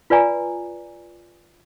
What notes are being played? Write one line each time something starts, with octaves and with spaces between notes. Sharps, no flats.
F4 B4 D5 G#5 A#5